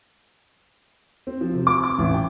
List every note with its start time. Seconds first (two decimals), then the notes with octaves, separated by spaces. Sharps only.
1.27 C4
1.41 F3
1.53 C3
1.67 D6
1.84 D6
1.98 A1
2.14 G5